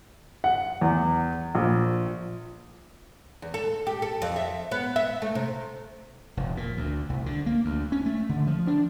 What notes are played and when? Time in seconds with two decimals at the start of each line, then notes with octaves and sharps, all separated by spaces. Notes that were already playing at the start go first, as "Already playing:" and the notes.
0.44 F#5
0.81 E2
1.55 A#1
3.42 E2
3.54 A4
3.87 G4
4.02 A4
4.22 F2
4.36 E5
4.71 B3
4.96 E5
5.22 A3
5.35 C3
6.37 F1
6.57 A#2
6.77 D2
7.10 C2
7.26 D3
7.46 A#3
7.65 D2
7.92 C#4
8.06 A3
8.29 D3
8.47 F3
8.67 D4